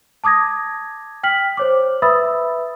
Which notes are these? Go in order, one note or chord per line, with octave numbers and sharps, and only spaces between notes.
A5 D6 D#6 G#6 A#6
G5 F6 B6 F#7
C5 C#5 D6
B4 E5 B5 D#6 E6 A6